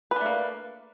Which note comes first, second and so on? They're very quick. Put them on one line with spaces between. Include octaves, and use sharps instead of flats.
B4 D4 A3 A#3